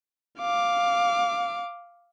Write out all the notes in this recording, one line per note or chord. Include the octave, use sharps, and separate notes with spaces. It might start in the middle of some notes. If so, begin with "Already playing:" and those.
F5 D6